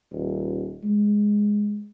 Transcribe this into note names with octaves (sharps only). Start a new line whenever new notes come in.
D#1
G#3